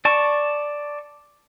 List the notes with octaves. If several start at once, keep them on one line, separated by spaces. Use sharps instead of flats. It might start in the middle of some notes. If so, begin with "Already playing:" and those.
D5 A5 C#6